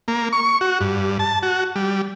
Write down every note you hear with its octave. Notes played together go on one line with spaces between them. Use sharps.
A#3
C#6
F#4
G2
A5
F#4
G3